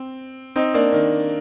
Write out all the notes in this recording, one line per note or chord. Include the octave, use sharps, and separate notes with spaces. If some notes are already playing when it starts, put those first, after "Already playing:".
Already playing: C4
C4 D#4
A#3 D4
D#3